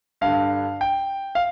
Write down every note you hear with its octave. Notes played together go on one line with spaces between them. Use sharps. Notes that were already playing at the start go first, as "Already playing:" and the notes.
G2 D3 F5
G5
F5